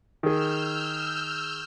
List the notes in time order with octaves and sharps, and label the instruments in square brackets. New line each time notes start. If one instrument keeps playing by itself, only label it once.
[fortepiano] D#3 G#4 [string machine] E6 F6 G6